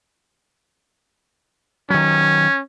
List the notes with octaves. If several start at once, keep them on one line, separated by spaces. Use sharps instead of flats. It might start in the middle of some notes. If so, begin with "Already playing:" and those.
D#3 F#3 C#4